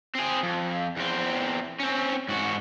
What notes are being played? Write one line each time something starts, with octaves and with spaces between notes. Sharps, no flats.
C4 G#4
F2
E2 C4
C4 C#4
G#2 F#4